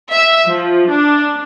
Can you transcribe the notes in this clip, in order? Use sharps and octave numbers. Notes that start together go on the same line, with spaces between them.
E5
F3
D4